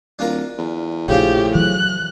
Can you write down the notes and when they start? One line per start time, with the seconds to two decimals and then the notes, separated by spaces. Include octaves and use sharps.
0.19 D1 D4 F4 A#4
0.58 E2
1.08 A#1 A2 C#3 F3 D4 F4 G4
1.55 E3 F#3 F#6